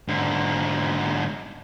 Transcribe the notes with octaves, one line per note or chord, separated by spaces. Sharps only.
G#2 D3